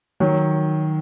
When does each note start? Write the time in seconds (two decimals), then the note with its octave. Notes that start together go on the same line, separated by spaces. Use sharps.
0.20 D#3 F#3